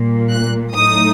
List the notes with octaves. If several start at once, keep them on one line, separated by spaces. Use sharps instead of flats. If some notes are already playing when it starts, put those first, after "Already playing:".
Already playing: A#2 G3 A#3
F#6
A2 F#3 A3 D#4 D#6